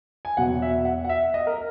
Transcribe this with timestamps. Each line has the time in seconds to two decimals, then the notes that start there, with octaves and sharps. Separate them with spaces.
0.25 G#5
0.37 E2 B2 F#3 F#5
0.62 E5
0.85 F#5
1.04 F#5
1.09 E5
1.34 D#5
1.47 A#4